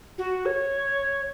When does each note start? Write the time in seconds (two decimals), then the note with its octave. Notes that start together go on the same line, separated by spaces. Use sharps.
0.18 F#4
0.46 C#5